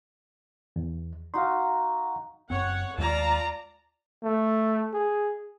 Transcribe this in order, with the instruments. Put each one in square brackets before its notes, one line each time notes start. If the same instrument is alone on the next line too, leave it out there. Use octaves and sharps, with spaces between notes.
[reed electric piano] E2
[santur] D#4 F#4 [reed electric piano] F5 C6
[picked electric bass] F#1 F#2 C4 [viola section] C#5 F#5
[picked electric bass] D#2 G#3 [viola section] F4 D5 [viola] A5 A#5
[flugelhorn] A3
G#4